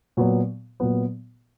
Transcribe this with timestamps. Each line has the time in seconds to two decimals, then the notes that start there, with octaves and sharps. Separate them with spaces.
0.17 A#2 F#3 B3
0.80 A#2 F#3 B3